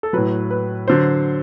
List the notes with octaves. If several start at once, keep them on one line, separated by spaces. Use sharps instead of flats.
A4
A2 F#3 B4
B4
D3 F#3 C5